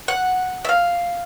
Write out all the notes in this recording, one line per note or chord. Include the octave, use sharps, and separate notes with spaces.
F#5
E5
F5